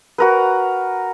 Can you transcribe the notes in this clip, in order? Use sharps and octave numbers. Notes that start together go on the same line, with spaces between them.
F#4 A#4 B4